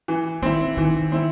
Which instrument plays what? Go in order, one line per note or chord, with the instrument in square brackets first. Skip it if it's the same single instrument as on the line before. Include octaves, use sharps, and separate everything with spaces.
[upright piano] E3
[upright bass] D#3 [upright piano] C4 E4
[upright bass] D#3 [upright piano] E3
[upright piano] C4 E4